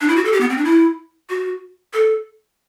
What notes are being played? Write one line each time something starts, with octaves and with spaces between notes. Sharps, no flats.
D4
E4
F#4
A4
G4
B3
C4
D4
E4
F#4
A4